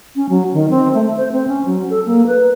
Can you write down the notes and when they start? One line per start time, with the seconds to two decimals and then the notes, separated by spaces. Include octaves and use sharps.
0.16 C#4
0.29 F#3
0.53 D#3
0.70 C4
0.94 A3
1.17 C5
1.32 C4
1.47 C#4
1.65 F#3
1.90 A4
2.06 A#3
2.27 B4